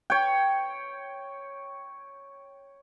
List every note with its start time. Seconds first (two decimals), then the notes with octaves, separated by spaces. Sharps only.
0.10 C#5 G5